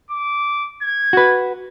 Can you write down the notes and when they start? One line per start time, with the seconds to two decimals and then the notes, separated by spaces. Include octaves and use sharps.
0.10 D6
0.82 G#6
1.13 F#4 B4